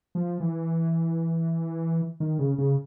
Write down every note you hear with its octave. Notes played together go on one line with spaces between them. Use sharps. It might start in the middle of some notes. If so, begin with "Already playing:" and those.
F3
E3
D#3
C#3
C#3